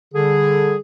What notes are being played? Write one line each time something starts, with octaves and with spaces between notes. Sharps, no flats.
D3 G3 G#4